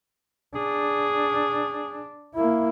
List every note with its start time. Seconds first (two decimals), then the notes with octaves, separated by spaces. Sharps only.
0.55 D4 G#4
2.35 A#3 E4